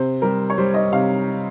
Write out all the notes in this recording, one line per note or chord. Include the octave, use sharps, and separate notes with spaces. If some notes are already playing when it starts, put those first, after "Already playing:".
Already playing: C3 C5
G3 A#4
C#5
G3 C5
D#5
C3 F5